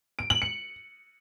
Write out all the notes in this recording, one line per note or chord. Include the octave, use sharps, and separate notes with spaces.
D7
F#7
C#7